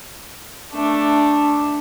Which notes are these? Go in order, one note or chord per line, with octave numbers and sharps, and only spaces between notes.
A3 D4